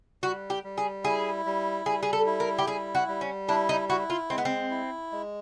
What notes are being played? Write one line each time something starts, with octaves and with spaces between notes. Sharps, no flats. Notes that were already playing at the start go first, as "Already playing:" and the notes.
G3 F#4
G4
G3
G#4
E4 G#4
G3
G3 G#4
G#4
A4
E4
A#4
G4
G3 G#4
F#4
G3
C#4
D4 E4
D#4
E4 F#4
F4
G#3 C4
B3
C4
E4
G#3